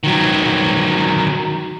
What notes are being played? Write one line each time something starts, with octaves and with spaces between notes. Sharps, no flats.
D#3 F#3